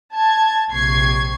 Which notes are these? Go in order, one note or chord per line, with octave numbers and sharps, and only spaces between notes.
A5 G#6
A#1 C3 C#6 G#6 C7